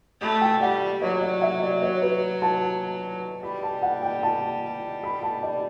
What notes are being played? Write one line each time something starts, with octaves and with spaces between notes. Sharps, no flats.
A3 B5
G5
G3 F#5
F#3 C#5
D5
E5
D5
C#5
B4
A5
G3 B5
A5
F#5
G5
A5
B5
A5
D5